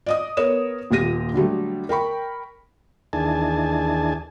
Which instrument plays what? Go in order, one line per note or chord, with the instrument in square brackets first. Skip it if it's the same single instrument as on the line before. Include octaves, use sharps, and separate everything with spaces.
[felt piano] D5 D#5 D#6
B3 A#4 C#5 D#6 E7
D#1 A#2 G4 A#6 D#7
D3 F#3 G3 A3
A#4 G5 B5 C#6
[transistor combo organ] D#2 E3 D4 G#4 G#5 A5